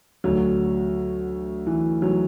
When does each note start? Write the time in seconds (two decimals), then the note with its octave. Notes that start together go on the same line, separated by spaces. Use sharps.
0.24 D2 D3 F#3
1.67 E3
2.02 F#3